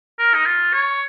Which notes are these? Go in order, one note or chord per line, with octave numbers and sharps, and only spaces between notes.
A#4
D#4
F4
C#5